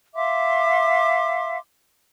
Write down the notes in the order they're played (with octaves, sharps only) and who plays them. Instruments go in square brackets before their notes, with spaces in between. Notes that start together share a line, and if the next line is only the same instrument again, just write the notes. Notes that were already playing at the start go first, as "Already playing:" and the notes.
[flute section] E5 F5 C6 D6